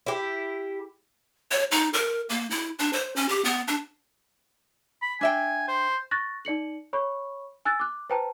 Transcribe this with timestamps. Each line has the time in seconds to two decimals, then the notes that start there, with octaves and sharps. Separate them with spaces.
0.06 E4 G4
1.51 C#5
1.71 D#4
1.93 A#4
2.29 A#3
2.50 E4
2.79 D4
2.93 C5
3.16 C#4
3.29 G4
3.44 B3
3.68 D4
5.02 B5
5.21 D4 E5 G5 G#5
5.68 C5
6.11 C#6 F#6 A6 A#6
6.45 D#4 D5 C#7 F#7
6.93 C#5 B5 C#6
7.65 G#5 E6 F#6 A6
7.80 D6 F#6
8.10 B4 C5 G5 A5 A#5